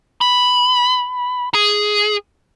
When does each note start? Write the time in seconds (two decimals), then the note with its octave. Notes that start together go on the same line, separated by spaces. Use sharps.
0.21 B5
1.54 G#4